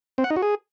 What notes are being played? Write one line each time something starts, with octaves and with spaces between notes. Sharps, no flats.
C4
F#5
D#4
F#4
G#4